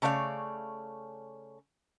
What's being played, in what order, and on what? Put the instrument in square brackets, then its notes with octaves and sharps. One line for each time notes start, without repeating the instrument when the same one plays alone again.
[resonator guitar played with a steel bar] C#3 A3 C#5 D5 F5